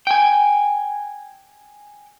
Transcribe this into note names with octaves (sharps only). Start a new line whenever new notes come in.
G5 G#5